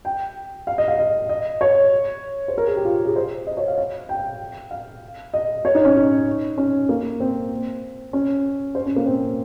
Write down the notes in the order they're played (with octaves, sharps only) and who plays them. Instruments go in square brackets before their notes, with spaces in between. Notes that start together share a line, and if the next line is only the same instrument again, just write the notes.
[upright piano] G5
F5
D#5
F5
D#5
D#5
C#5
C5
A#4
G#4
G4
F4
G#4
C5
D#5
C#5
F5
F5
G5
F5
D#5
C#5
D#4
C#4
D#4
C#4
A#3
C4
C#4
C5
C#4
A#3
C4